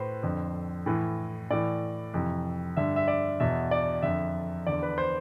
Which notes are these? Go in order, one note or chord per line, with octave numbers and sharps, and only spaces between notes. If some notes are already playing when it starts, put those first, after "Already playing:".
Already playing: A2 B4 C5
F2 D3
A2 E3
A2 E3 D5
F2 C3 E3
G2 D3 E5
E5
D5
E2 B2 E5
D5
F2 D3 E5
E2 D3 D5
B4
C5